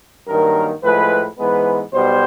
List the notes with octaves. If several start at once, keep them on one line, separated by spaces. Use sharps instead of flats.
G2 D#3 F#3 A#3 A#4
A2 F3 G#3 B4
G#2 E3 G#3 B3 B4
B1 B2 G3 B3 C5